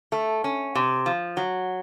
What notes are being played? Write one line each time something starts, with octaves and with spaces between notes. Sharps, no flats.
A3
C#4
C3
F3
F#3